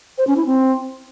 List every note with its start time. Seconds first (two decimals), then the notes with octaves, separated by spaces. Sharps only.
0.18 C5
0.27 C#4
0.37 E4
0.46 C4